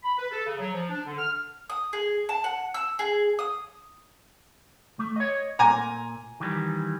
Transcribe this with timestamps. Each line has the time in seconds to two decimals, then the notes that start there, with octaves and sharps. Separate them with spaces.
0.03 B5
0.18 B4
0.31 A4
0.47 C#3
0.59 F#3
0.73 F3
0.89 D4
1.06 D3
1.18 F6
1.70 D#6
1.93 G#4
2.29 A5
2.44 F#5
2.74 E6
2.99 G#4
3.39 D#6
4.99 A3
5.16 C#5 D#5
5.59 A#2 G#5 A#5
6.40 D#3 E3 G3